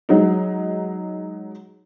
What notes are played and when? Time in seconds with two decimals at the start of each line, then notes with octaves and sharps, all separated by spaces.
0.09 F#3 G#3 D#4